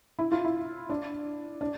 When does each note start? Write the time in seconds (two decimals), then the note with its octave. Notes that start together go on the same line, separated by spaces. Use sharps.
0.19 E4
0.32 F4
0.45 E4
0.90 D4
1.61 D4